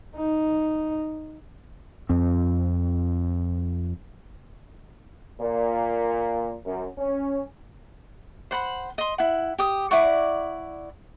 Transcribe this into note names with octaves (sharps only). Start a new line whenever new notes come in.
D#4
F2 C4
A#2
F#2
C#4
C5 F#5 B5
D#5 C6
E4 F#5
G4 D#6
E4 D5 F#5 C#6